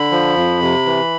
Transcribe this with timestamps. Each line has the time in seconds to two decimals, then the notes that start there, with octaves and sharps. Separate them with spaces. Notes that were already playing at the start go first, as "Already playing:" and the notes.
Already playing: D3 B5
0.11 F3
0.36 F2
0.62 C3
0.86 E3